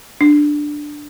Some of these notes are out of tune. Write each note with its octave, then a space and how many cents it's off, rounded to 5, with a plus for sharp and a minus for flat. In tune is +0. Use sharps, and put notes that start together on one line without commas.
D4 +10